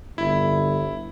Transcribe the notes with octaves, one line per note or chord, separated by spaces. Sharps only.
G1 E4